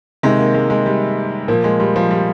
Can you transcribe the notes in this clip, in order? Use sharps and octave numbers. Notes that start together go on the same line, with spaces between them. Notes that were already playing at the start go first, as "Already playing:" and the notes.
C3 D#3 G#3
A#3
G#3
G#3
G3
A#2 F3 A#3
G#3
G3
F3
G3